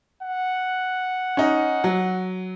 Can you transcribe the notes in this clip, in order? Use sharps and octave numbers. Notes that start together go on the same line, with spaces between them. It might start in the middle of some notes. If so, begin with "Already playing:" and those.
F#5
C#4 D#4
F#3